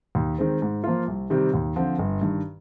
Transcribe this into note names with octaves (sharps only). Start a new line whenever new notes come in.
D#2
D#3 G#3 C4
G#2
F3 A#3 F4
C2
C3 D#3 G3 C4
D#2
D3 F3 C4
G1
G2 D#3